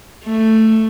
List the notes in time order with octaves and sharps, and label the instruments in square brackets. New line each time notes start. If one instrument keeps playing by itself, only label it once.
[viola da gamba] A3